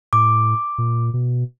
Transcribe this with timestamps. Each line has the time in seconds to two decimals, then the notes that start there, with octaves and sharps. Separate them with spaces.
0.13 A2 D6
0.78 A#2
1.13 B2